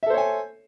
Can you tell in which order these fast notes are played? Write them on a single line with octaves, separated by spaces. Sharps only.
E5 A4 C5 C#5 G#5